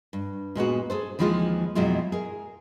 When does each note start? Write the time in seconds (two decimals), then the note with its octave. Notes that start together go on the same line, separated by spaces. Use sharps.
0.13 G2
0.55 A#2 G#3 B3 F#4
0.90 G#4 A4 C5
1.19 D#2 E3 F3 G#3 F4 G#4
1.75 F2 B2 F#3 G#3 E4 F4
2.12 G#4 A#4